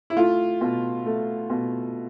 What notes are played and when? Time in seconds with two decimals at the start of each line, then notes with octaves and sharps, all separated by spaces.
0.10 E4
0.17 A3 F4
0.61 B2
1.06 A3
1.50 B2